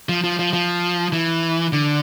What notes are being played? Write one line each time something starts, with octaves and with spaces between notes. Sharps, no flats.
F3
F3
F3
F3
E3
D3